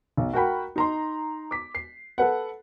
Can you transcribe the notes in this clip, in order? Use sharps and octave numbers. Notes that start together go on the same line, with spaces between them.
B1
F#4 A#4 F#5 G5 B5
D#4 A#5 C6
D6 B6
C7
A4 B4 F#5